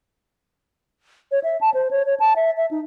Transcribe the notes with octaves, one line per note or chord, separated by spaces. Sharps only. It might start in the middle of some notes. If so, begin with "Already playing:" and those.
C#5
E5
A5
C5
C#5
C#5
A5
E5
E5
D#4